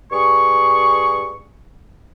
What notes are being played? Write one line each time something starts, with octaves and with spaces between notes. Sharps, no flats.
G2 G#4 C#6